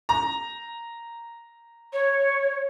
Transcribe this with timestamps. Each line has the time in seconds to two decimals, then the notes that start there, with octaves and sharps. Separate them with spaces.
0.09 A#5
1.93 C#5